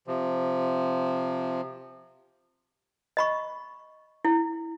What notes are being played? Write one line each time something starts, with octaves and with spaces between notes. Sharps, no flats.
C3 F3
D#5 B5 C#6
E4